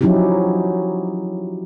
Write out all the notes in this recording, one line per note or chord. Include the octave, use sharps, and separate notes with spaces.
F3 F#3 C#4 D#4 E4 G4